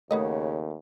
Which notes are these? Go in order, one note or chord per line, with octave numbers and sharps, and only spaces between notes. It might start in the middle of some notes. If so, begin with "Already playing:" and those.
D#2 C#3 A3 G#4 A#4 B4 D#5 F#5